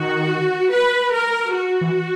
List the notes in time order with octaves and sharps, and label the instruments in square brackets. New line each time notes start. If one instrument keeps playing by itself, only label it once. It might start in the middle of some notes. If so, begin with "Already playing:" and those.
Already playing: [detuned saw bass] D#3 [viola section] F#4
[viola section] B4
A#4
F#4
[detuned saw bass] E3